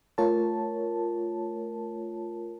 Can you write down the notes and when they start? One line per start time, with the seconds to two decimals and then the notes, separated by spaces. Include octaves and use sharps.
0.18 A3 F4 A#4 C#5 A5